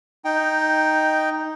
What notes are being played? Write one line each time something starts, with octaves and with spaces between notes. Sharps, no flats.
D#4 G5